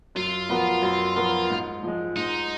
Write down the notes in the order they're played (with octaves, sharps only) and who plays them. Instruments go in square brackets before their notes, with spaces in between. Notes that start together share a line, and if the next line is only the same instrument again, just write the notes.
[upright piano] F#2 [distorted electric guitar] F4
[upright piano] F3 B3 F#4 A#4
F#2
F3 B3 F#4 A#4
G#2
F3 G#3
[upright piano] G#2 [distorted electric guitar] D#4